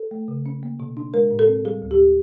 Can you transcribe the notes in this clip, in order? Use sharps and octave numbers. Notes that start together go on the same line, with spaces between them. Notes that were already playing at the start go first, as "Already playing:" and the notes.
Already playing: A4
A3
C#3
C#4
A#3
B2
D4
G#3 A#4
A2
A4
C4
G3 G#4
D2
G4